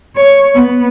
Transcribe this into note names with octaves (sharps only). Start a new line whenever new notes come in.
C#5
B3